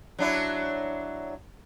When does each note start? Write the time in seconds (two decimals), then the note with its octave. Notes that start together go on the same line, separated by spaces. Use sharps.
0.18 F#3 D4 E4